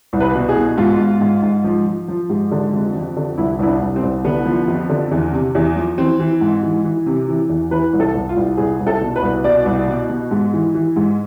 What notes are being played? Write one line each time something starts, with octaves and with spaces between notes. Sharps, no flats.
C2
B4
B2
G#4
B2
G#2 F4
G#2
G#2
G#2
F3
F3
F3
G#2
D3
F2
F2
D3
C2 E4
C2 E4
D4
C2
C4
C2
D3 B3
F3
F2
D3
E2
C3
E2
F3
E3 C4
E3
G#2
E3
E3
C3
E3
E2
E3 B4
C2
A4
C2
F4
C2
C2 G#4
C2
A4
B2
B4
C2
B2 D5
C2
B2
B2
G#2
E3
E3
G#2